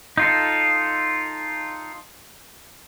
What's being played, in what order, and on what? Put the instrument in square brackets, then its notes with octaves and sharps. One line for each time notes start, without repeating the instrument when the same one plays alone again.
[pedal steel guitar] D#4 F4 A4